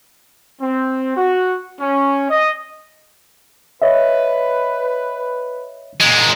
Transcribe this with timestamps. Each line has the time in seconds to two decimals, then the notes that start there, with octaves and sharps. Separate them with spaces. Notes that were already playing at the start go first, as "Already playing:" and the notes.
0.61 C4
1.17 F#4
1.80 C#4
2.30 D#5
3.82 B4 C#5 D#5 E5
6.01 A#2 G#3